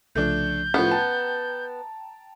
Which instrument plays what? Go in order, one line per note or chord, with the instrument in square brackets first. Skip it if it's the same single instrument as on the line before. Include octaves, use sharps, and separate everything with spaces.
[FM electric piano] C2 C#3 F3 [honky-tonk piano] A3 D4 [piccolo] G6
[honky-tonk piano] A2 F3 [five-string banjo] B3 [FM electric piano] C#4 G4 B4
[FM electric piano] G5 A#5 [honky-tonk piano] A5